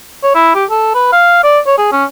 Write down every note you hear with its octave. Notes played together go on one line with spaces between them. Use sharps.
C#5
E4
G4
A4
B4
F5
D5
C#5
G#4
C#4